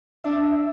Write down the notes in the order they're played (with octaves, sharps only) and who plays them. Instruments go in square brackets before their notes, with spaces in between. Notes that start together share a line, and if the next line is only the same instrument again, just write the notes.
[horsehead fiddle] D4 [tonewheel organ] E5